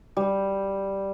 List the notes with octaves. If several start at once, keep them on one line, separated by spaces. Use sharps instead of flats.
G3